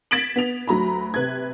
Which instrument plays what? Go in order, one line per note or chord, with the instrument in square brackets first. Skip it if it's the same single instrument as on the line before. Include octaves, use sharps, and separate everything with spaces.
[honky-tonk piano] G#6 A6 B6 D7 E7 F#7
B3 F7
D2 F#3 A#5 B5
C3 B4 G#6